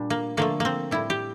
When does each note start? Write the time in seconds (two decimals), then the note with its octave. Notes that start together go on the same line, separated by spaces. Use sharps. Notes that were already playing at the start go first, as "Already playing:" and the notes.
Already playing: A#2 G3 D4
0.10 A#3
0.37 D3 F3 A3 A#3
0.60 A#3 C4
0.91 A2 G3 E4
1.10 G4